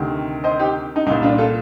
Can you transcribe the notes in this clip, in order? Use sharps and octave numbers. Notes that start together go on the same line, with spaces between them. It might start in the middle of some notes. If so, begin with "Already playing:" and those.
Already playing: D2 C3 D#3
C5 D#5
D#4 G4
D#4
C2 A#2 D#4
D4 F4
F4 A4